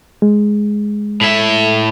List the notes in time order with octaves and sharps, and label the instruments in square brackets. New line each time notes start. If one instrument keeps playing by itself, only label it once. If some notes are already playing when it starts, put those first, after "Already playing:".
[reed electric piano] G#3
[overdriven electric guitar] A2 E5